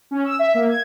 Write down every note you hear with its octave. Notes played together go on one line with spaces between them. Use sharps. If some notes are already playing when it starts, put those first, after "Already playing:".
C#4
E6
E5
A#3
G#6